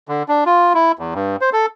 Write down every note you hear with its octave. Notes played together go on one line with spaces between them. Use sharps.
D3
D4
F4
E4
E2
G2
C5
A4